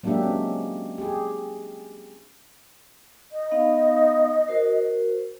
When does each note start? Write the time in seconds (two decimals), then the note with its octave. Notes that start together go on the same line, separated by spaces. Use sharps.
0.03 F#3 G#3 A#3 D4 G4 E5
0.22 C4 C#4
0.98 G4 G#4
3.32 D#5
3.51 B3 D#4 F5
4.48 F#4 A#4 C5